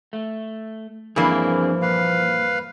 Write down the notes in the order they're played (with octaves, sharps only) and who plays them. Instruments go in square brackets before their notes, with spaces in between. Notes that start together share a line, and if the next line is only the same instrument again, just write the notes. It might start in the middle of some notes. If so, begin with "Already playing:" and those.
[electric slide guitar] A3
[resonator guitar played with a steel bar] G2 E3 A#3 [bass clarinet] F3 [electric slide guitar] C4 D4 G#4
[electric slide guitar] A#2 [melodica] B4 F5